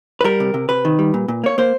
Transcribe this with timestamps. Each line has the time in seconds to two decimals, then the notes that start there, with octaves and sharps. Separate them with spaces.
0.21 B4
0.24 G3 A#4
0.40 C3
0.54 C3
0.69 C3 B4
0.85 D#3
0.99 G3
1.14 A#2
1.28 A#2
1.44 A#3 C#5
1.58 A#3 C5